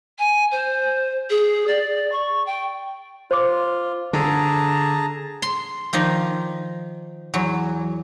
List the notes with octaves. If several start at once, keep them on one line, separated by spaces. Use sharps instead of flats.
G#5
C5
G#4
D5
C#6
G5
F4 C5 D6
D3 G#4 A5 A#5
C6
D#3 F3 D#4 D5
E2 F#3